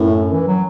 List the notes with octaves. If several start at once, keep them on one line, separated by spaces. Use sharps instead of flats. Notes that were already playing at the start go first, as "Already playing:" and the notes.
Already playing: F#2 A2
E3
F#3